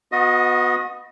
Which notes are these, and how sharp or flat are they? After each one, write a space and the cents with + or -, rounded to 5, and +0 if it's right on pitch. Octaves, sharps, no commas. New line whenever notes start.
B3 +5 F#4 -30 D#5 +15